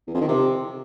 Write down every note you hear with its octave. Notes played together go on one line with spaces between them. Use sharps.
E2
F2
D#3
C3